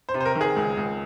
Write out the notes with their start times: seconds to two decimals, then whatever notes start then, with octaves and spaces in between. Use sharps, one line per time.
0.09 C5
0.14 C3
0.21 C5
0.25 A#4
0.35 D#3
0.41 G#4
0.56 C#2
0.77 C#2